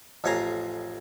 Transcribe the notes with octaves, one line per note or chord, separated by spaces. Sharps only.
A1 F2 C#5 F5 G#5 A#5